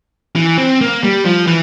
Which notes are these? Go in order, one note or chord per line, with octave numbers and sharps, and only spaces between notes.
E3
C4
A#3
G3
F3
E3